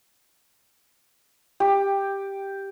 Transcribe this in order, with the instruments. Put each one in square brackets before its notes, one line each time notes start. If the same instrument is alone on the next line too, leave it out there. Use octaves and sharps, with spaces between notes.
[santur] G4